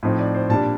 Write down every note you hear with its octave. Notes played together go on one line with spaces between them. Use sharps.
A2 F3 C4 D#4
D5
C5
A#2 G3 D4 A5